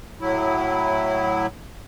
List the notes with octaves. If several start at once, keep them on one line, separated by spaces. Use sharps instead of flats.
A2 F#3 E4